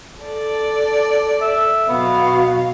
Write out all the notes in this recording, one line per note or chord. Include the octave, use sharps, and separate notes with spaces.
A4 D5
E5
B2 F#3 B3 F5